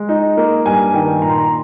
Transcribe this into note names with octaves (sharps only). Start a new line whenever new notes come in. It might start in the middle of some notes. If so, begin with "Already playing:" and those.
Already playing: G#3
D#4
A#3
G2 G#5
D#3 G5
A#2 A#5
C6
A#5